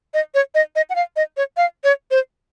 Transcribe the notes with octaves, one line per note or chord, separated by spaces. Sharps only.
D#5
C#5
D#5
D#5
F#5
F5
D#5
C#5
F5
C#5
C5